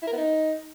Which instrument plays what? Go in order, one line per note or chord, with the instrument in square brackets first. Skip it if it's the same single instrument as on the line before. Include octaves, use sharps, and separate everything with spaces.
[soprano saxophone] E4
A#4
B3
D#4